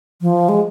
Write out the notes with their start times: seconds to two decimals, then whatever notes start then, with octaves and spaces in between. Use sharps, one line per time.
0.22 F3
0.49 G#3